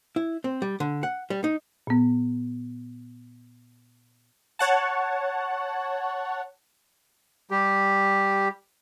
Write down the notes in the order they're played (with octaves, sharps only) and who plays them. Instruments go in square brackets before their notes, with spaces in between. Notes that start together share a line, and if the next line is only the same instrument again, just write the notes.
[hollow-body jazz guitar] E4
C4
G3
D3
F#5
G3
D#4
[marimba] A#2 B3
[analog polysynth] C#5 F#5 A5
[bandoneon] G3 G4